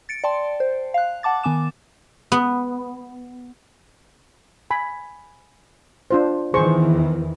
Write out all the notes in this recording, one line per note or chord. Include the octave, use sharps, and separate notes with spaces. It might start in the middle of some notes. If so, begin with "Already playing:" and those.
A6 C#7 D7
D5 G5 A5 C6
C5
F5 F#6
F#5 A5 D6 A6
D#3 B3 G#5 D6 E7
B3
G#5 B5
D4 F4 C5
E2 D#3 E3 G#4 C5 C#6